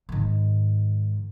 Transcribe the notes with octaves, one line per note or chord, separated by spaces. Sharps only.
G#2 D#3